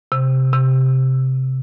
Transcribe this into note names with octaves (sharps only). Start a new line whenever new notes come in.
C3
C3